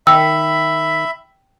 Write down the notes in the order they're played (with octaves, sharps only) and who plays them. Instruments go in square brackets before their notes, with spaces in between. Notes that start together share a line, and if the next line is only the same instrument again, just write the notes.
[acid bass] D#3 [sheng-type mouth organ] E5 B5 [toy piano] G5 [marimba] E6